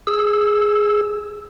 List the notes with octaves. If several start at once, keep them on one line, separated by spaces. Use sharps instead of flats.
G#4 E6